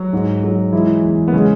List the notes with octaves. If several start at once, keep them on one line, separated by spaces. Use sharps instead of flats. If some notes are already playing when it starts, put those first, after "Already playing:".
Already playing: F#3 F#4
G#2
F#3
E3 G#3 E4
E2
B3
C#3 G#3 C#4